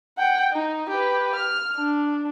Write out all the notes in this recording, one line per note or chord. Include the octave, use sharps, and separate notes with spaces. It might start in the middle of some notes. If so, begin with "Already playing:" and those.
F#5 G5
D#4
G4 B4
F6
D4